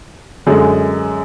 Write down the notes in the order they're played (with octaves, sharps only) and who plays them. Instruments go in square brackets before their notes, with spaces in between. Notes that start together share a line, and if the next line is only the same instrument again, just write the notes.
[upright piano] F#2 D3 G#3